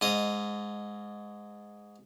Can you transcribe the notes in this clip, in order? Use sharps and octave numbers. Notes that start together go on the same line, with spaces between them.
G#2 D#5 F5